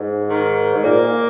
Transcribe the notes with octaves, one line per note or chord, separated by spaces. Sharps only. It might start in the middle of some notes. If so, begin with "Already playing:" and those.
Already playing: G#2
D#3
G#2
A#2 A#3